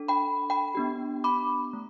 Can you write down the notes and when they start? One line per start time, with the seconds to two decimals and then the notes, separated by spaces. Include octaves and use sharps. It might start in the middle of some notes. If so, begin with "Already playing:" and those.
Already playing: D4 A4
0.08 G5 B5
0.50 G5 B5
0.75 B3 D4 G4
1.24 B5 D6
1.73 A3